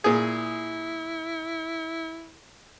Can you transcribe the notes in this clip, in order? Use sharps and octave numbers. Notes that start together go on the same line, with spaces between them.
A#2 E4 G#4